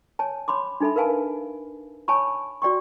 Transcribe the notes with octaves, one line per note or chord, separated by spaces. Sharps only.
C#5 G#5 A5
C#5 B5 C6 D6
D4 D#4 A4 E5 B5
A#4 B4 F5 G#5 A5
C#5 G#5 A5 B5 C#6
F#4 D5 G5 C#6